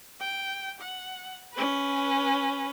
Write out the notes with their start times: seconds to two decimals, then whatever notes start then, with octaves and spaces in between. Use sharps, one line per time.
0.21 G5
0.81 F#5
1.53 C#4 B4